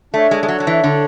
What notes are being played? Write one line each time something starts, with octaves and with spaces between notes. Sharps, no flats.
A3 D4 A4 C#5
G#3
G#3
F#3
F#3
E3
D3